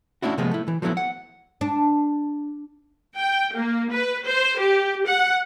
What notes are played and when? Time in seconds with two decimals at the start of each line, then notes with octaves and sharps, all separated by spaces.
0.22 A3 C#4 D4 E4 F#4
0.38 C3 F3 G#3 A#3 B3
0.51 A3 E4
0.68 E3
0.82 F3 F#3 A3 B3 E4
0.97 F#5
1.61 D4
3.16 G5
3.55 A#3
3.91 B4
4.24 C5
4.58 G4
5.05 F#5